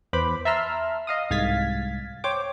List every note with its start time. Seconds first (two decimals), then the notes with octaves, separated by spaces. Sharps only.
0.13 E2 B4 C5 B5 D6
0.45 E5 A5 A#5 C6 E6 F6
1.07 D#5 F5 D#6
1.30 C2 G#2 F5 G#6 A6 B6
2.24 C5 C#5 G5 D6